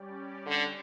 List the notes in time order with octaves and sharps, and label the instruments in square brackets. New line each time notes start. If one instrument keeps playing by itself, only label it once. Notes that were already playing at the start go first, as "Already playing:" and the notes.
Already playing: [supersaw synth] G3 C#4 G4 D5
[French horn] D3